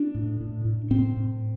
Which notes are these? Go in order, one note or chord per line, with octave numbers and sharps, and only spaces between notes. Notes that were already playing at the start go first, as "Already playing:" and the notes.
Already playing: D4
A2
A2
A2
A2 C4
A2